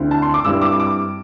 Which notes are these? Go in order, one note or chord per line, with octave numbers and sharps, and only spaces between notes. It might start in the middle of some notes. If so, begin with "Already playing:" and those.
Already playing: D2 D3 C4 E4
A5
C6
D6
G2 G3 C4 E4 E6
D6
D6